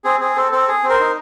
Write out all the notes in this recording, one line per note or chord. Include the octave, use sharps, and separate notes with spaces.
C4 G#4
C4 G#4
C4 A4
C4 A4
G#4
C4
A#4 C5
D#4